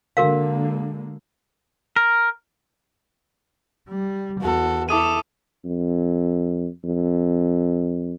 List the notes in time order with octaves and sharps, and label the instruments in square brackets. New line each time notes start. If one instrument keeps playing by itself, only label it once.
[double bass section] D3 G#3 A#3 [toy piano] F#4 A#4 F5
[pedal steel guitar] A#4
[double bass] G3
[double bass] E2 [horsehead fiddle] F#4 A4
[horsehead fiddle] E4 A4 [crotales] D6 D#6 D#7
[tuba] F2
F2